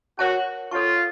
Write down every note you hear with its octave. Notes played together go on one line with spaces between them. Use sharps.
F#4 A#4 C#5 F#5 A5
F4 A4 C#5 A5 C#6